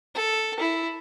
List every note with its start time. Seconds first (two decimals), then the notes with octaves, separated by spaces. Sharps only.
0.15 A4
0.60 E4